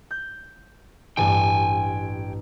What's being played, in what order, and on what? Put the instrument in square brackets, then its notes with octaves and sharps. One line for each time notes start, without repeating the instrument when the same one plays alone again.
[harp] G6
[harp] A1 G2 [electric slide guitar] G5 G#5